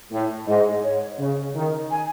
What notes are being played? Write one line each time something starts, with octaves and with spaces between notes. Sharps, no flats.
A2
G#2 D#5
C#5
C#3
D#3
G#5